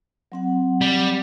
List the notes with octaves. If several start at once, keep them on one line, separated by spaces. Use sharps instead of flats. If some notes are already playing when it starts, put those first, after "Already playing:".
F#3 C4 F#5
G3